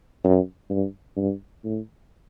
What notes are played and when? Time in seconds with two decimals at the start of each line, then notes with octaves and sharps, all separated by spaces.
0.24 F#2
0.70 G2
1.17 G2
1.65 A2